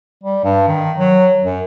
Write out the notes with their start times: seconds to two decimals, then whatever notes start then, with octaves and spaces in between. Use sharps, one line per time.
0.24 G3
0.44 G2
0.68 D#3
0.98 F#3
1.43 F#2